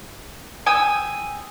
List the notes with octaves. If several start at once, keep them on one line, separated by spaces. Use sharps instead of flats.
G5 G#5 D#6 E6